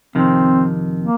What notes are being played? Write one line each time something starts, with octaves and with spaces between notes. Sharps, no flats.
F2 C3 D#3 C4
A#3